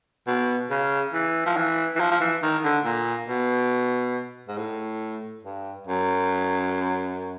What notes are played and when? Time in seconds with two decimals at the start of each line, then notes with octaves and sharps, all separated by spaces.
0.27 B2
0.70 C#3
1.13 E3
1.46 F3
1.56 E3
1.96 E3
2.00 F3
2.11 F3
2.20 E3
2.42 D#3
2.64 D3
2.85 A#2
3.28 B2
4.48 G#2
4.57 A2
5.43 G2
5.87 F#2